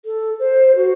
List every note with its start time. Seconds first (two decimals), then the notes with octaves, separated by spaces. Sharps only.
0.05 A4
0.39 C5
0.75 F#4